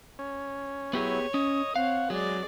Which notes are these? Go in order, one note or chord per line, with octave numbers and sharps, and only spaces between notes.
C#4
F#3 B3 E4 G4 G#4 C#5
C#4 D#5 D#6
C4 C#5 F5 F#5
F#3 G#3 G#4 D5